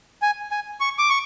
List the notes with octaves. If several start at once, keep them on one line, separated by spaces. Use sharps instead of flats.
G#5
G#5
C#6
D6
C#6